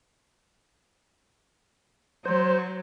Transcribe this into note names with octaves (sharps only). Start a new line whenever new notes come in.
F#3 C5